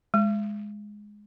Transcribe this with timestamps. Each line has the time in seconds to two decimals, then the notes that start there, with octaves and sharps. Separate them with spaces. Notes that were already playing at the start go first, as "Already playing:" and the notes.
0.14 G#3